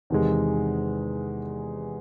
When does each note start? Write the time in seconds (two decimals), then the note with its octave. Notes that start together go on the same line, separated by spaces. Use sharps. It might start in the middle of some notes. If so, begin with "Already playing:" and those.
0.10 E2 C3 D#3 G#3